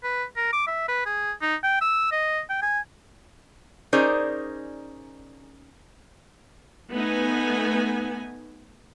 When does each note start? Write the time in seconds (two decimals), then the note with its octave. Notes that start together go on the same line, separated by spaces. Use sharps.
0.04 B4
0.37 A#4
0.53 D6
0.67 E5
0.88 B4
1.06 G#4
1.42 D#4
1.64 G5
1.81 E6
2.12 D#5
2.50 G5
2.62 G#5
3.93 C#4 D#4 G#4 A#4 C5 D5
6.91 A3 B3 D#4 B4 G#5